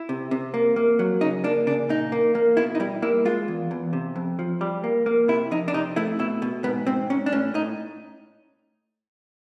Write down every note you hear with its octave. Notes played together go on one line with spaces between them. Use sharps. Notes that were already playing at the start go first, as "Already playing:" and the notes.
Already playing: E4
C3
C3
A#3
A#3
F#3
C#3 D#4
A#3 D4
C#3 D4
A#2 D#4
A#3
A#3
B2 E4
D#4
G3 E4
A#3 E4
G#3 F4
E2
E2
C3
F2
F3
G3
A#3
A#3
C3 E4
F2 D#4
D4
C3 D#4
A3 E4
B2 E4
B2
G#2 B3
G#2 C4
G#2 C#4
D4
A2 C#4
A2 D#4